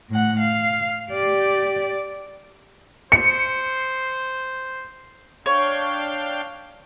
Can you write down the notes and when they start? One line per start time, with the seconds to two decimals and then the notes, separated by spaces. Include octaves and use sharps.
0.10 A2 F#5
0.40 F5
1.12 G4 D5
3.12 C5 C#7
5.46 D4 C#5 F5 G5